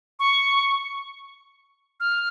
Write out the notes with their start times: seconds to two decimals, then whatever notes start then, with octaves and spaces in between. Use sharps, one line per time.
0.19 C#6
2.00 F6